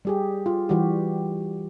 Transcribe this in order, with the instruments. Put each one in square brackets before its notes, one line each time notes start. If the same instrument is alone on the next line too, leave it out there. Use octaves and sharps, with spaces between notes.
[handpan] G3 G4 G#4
F4
E3 G3 F#4 G4